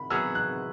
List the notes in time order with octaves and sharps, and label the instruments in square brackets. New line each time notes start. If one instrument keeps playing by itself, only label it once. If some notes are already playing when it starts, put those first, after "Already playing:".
Already playing: [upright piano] B5
[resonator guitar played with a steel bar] F#3 B3 G#4 [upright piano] E6
[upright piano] F#6